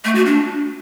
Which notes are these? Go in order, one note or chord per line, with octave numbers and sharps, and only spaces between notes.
A3
F#4
D4